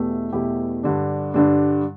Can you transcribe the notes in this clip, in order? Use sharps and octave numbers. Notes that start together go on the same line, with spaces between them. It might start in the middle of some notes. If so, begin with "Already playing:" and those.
Already playing: E2 B2 A3 E4 G4
E2 B2 A3 E4 G4
G2 D3 G3 D4
G2 D3 G3 D4